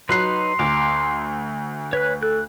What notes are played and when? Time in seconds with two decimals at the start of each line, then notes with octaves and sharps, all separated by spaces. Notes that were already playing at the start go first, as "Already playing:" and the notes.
0.09 F#3 D#4 B4 B5 C6 F#6 C7
0.59 D2 A#5 D6
1.93 B4 C#5 F#6
2.23 A4 F#6